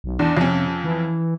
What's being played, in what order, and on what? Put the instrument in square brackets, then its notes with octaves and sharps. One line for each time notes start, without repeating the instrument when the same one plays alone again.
[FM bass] B1
[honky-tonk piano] E2 [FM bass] D4
[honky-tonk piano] F2 C#4 [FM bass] C3
[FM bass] E3